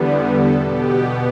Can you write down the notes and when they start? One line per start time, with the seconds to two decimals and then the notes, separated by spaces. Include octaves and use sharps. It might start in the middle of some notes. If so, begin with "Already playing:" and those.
Already playing: E2 D3 G3 B3
0.33 A4
0.61 B2 B3 G4